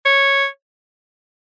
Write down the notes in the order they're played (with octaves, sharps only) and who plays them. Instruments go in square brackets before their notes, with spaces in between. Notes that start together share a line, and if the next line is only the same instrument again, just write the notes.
[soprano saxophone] C#5